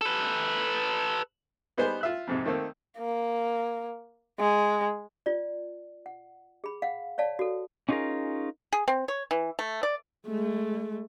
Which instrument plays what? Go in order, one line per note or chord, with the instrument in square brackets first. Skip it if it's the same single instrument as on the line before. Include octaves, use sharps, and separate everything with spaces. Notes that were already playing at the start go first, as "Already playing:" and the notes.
[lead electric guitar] A4 B4
[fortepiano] G3 B3 D#4 G#4 C5
F4 E5 F#6
F2 G#2 C3
D#3 A3 A#3 C4
[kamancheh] A#3
G#3
[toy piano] F4 D5
F#5
G#4 B5
F5 F#5
C#5 D5 F5 A5
F#4 A4
[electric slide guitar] C#4 D#4 F4 G4 G#4 A#4
[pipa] G#4
C4
C#5
E3
A3
D5
[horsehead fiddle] G#3 A3